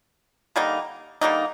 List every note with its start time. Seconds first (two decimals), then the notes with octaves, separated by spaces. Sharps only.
0.56 D3 G3 A#3 D#4
1.21 D3 G3 A#3 D#4